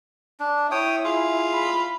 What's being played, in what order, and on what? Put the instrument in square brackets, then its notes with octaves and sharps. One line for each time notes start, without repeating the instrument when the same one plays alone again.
[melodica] D4
[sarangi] E4 [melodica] C#5 G5 D#6
[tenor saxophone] F4 [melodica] G#4
[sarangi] B5